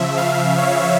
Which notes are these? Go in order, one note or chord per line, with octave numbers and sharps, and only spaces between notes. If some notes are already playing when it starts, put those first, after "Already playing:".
Already playing: C#3 F3 E5
F5
C#5